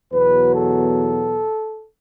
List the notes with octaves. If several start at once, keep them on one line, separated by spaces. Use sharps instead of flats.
E2 B2 F#3 B4
A4